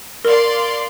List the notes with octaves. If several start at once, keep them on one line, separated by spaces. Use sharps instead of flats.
A#4 D5 F5 C6